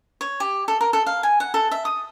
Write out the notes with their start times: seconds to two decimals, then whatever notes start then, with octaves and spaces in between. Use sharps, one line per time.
0.21 C#5
0.40 G4
0.68 A4
0.81 A#4
0.93 A4
1.07 F5
1.23 G#5
1.40 F#5
1.54 A4
1.71 E5
1.85 D#6